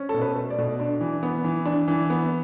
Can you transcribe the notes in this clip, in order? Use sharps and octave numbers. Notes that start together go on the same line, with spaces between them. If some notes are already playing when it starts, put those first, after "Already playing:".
Already playing: C#4
A4
B2
B4
A3
D5
B2
D4
E3
B3
E3
D4
E3
B3